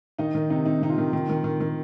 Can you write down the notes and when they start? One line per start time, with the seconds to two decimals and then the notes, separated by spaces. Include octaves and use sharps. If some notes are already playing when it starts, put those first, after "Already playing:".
0.19 D#3 D#4 D#5
0.35 D#3
0.50 C3 D#4
0.66 C3 D#4
0.81 C3 D#4
0.89 F4
0.98 D#3
1.13 D#3
1.29 D#3
1.44 D#3
1.60 D#3